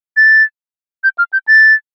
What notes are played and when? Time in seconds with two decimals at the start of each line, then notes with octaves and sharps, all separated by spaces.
0.17 A6
1.04 G6
1.18 F6
1.33 G6
1.48 A6